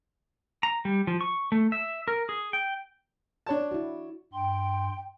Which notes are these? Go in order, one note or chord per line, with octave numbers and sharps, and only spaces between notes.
A#5
G3
F3
C#6
A3
E5
A#4
G#4
G5
D4 C#5 A5
E4 F#4
G2 G5 C6